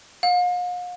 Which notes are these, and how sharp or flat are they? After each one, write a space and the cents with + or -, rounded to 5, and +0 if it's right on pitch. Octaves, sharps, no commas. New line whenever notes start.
F5 +45